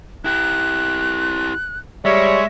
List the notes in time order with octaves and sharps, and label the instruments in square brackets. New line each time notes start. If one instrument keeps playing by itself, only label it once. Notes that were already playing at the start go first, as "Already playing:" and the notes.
[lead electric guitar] E4 G4 [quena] F#6
[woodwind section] G3 C#5 [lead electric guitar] G#3 [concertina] E5